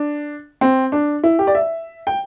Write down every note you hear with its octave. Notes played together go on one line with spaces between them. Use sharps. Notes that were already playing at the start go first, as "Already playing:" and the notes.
Already playing: D4
C4
D4
E4
G4
D5
E5
G5